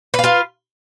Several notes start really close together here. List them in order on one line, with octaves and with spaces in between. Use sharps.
B4 F5 F4